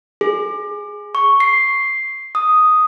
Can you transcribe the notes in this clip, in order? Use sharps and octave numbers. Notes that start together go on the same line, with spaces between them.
G#4
C#6
C7
D#6